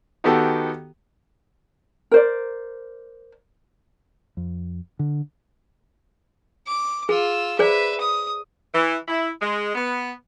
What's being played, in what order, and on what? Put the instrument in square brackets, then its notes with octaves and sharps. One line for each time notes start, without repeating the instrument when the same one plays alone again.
[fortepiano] D#3 B3 F#4 G4 A4
[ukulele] A#4 C5 D5
[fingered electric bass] F2
D3
[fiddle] D6
[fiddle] F4 E6 [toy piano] G#4
[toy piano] G#4 C5 D5 [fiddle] B4 E5
[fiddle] D#6
[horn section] E3
E4
G#3
B3